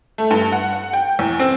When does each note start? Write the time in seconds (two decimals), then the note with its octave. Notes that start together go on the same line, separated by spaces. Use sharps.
0.18 A3
0.31 G2
0.52 F#5
0.73 F#5
0.93 G5
1.19 E2
1.40 C4